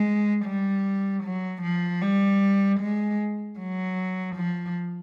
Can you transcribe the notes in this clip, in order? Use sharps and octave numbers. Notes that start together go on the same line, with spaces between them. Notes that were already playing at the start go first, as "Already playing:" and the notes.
Already playing: G#3
G3
F#3
F3
G3
G#3
F#3
F3